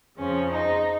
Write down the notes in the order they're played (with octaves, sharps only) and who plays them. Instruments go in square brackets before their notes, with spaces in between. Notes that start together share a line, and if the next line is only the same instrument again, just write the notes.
[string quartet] F2 C#3 F3 C#4
D#4